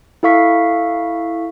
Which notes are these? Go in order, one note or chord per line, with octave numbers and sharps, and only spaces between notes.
E4 A4 F5 C#6 B6